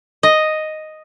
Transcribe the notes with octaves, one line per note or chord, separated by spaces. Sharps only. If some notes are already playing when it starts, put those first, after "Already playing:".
D#5